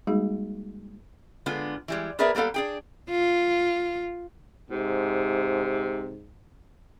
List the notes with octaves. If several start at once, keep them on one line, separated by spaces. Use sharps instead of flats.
G3 G#3 A#3 D#4 F#4 G#4
D3 G#3 B3 F4
E3 G3 G#3
B3 G#4 A#4 B4 D5 E5
G3 A#3 B3 A4 F5
D4 G#4 G5
F4
G#2 C3